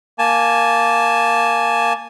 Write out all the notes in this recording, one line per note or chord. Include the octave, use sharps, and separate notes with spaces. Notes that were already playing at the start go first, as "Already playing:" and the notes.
A#3 G#5 A5